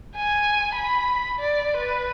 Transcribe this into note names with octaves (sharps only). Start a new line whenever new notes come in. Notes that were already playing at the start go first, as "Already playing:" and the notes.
G#5
B5
D5
B4